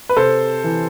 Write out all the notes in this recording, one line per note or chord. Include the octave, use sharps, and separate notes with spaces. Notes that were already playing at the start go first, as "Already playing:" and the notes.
B4
C3 A4 C5
E3